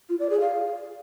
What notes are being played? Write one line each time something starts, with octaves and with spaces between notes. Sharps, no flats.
F4
D5
G#4
F5